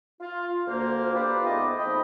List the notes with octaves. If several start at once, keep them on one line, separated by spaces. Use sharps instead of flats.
F4
D2 A#3 C5
F4 G4 B4 C5 D5 B5
G#2 A3 B3 D5 D#5
F3 C4 D#4 D#5 G5 B5